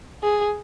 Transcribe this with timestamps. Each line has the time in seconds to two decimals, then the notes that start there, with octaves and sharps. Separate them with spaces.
0.23 G#4